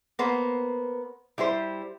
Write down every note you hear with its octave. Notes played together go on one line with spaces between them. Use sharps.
A#3 B3 C5
G3 E4 G4 C5